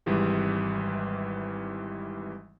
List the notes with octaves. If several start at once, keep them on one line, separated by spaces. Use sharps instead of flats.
G#1 G#2 C3 E3 G3 G#3